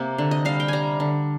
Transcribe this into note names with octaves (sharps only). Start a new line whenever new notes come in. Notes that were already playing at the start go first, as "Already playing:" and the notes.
Already playing: C3 A#3
D3
D#5
G3 F5
G5
G3 G#5 A#5
D3